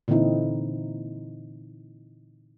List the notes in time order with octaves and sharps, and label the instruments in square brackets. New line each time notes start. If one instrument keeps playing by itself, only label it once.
[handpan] A#2 D3 E3 C4 D#4 E4